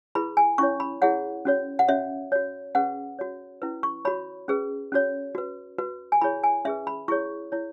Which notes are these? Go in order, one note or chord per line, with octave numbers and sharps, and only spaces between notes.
E4 G#4 B4 B5
G#5
C#4 E4 C#5 C#6
B5
E4 G#4 C#5 F#5
C#4 F#4 C#5
F#5
C#4 F#4 C#5 E5
F#4 C#5
C#4 G#4 B4 F#5
F#4 C#5
C#4 E4 B4
C#6
F#4 C#5 B5
C#4 G#4 B4
C#4 F#4 C#5
F#4 B4
F#4 B4
G#5
E4 G#4 C#5 B5
G#5
C#4 G#4 B4 E5
B5
E4 G#4 C#5 C#6
E4 C#5